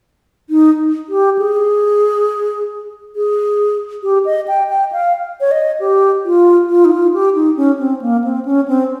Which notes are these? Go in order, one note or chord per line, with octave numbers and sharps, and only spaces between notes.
D#4
G4
G#4
G#4
G4
D#5
G5
G5
F5
C#5
D#5
G4
F4
F4
D#4
F4
G4
D#4
C#4
C4
A#3
C4
C#4
C4